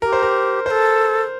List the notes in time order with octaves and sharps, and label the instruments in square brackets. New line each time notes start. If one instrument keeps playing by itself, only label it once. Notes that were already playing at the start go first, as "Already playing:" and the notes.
[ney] G4 [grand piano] A#4
[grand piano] C5
A#4
[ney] A4 B4 [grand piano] C5